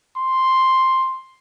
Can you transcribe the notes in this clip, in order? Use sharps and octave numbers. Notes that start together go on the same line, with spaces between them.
C6